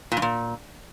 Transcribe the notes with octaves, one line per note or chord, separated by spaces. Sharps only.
A#2
G2
A#2